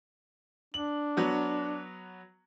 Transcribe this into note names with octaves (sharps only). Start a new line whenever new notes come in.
D4 F#7
F#3 B3 F#4